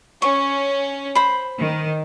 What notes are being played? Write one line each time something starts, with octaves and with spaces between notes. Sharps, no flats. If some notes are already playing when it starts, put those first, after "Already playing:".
C#4 C#6
C5 B5
D#3